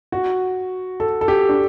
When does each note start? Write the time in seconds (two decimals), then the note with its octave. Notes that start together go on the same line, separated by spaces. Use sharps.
0.12 F#4
1.00 A4
1.21 A4
1.28 G4
1.49 D4